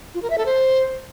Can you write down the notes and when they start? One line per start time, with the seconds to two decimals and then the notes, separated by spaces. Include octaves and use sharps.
0.14 F4
0.22 A#4
0.30 E5
0.38 A4
0.46 C5